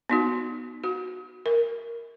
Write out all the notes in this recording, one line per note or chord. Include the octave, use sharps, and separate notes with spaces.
B3 D#4 F#4
F#4
A#4